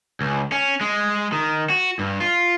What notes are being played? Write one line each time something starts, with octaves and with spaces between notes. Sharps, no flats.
C#2
C#4
G#3
D#3
F#4
G2
F4